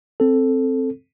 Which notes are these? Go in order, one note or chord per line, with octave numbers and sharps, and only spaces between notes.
C4 A4